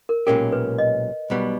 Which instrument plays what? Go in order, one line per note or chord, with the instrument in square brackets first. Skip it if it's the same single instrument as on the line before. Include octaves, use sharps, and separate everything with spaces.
[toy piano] A#4
[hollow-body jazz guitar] B1 A#2 G#3 C#4 G4 [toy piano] A#4
[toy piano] B4
D#5
[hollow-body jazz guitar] B1 B2 G3 B3